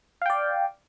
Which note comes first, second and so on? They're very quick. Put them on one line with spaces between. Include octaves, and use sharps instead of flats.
F5 G5 D5